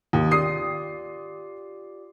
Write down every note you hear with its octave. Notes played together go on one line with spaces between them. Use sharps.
D#2 D#6
F4 G4 D5 D#6 C7